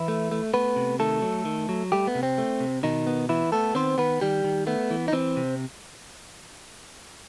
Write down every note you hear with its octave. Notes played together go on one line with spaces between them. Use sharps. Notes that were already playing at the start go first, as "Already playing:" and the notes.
Already playing: E3 E4
A3
A3
A3 B3 B4
C3
D#3 A3 A4
F#3
D#3
F#3
G3 A3 G4
B3
C3
C4
A3
C3
B2 D#3 D#4
B3
E3 B3 E4
A3 B3 A4
D#3 C4 C5
D#3 B3 B4
D#3 G3 G4
D#3
A3 B3
E3
D#4
E3 C4
C3